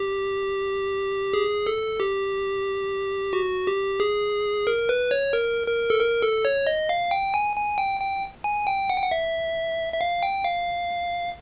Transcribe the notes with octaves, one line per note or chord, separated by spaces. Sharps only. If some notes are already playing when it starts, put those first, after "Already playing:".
Already playing: G4
G#4
A4
G4
F#4
G4
G#4
A#4
B4
C#5
A#4
A#4
A4
A#4
A4
C#5
D#5
F5
G5
G#5
G#5
G5
G5
G#5
G5
F#5
G5
F#5
E5
E5
F5
G5
F5